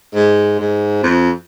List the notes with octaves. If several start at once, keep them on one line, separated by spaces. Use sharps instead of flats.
G#2
G#2
F2